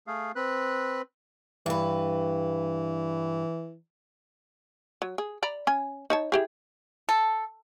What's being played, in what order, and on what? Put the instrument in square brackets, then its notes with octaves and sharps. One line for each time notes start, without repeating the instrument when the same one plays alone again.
[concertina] A3 G#4 F5
C4 B4 F#6
[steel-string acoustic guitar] G2 B4 [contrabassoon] E3
[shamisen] F#3
G#4
D5 A#5 B5
C#4 G#5
D#4 C#5 A5
E4 G4 G#4
[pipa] A4